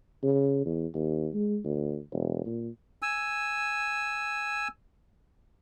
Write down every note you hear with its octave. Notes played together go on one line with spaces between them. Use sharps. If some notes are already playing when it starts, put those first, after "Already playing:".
C#3
E2
D#2
G#3
D2
E1
A#2
G#5 E6